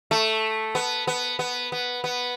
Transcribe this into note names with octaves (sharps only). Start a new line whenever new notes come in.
A3
B3
B3
B3
B3
B3